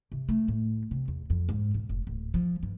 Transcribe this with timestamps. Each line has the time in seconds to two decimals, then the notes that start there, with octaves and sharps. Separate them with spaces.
0.12 C3
0.29 A3
0.48 A2
0.91 C3
1.08 E2
1.30 F2
1.49 G#2
1.74 B2
1.89 F1
2.07 D1
2.34 F3
2.63 G2